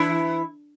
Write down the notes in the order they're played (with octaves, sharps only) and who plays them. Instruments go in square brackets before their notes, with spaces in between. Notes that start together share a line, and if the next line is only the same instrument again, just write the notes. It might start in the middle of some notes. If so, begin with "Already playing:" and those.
Already playing: [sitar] E3 E4 [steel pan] D4